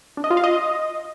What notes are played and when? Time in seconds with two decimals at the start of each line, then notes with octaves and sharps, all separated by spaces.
0.17 D4
0.24 D#5
0.30 F4
0.37 F5
0.44 D#5